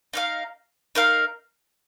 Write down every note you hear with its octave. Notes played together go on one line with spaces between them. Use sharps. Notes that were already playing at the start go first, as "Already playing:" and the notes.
D#4 A#4 F5
D#4 A#4 F5